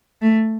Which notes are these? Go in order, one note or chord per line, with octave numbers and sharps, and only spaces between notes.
A3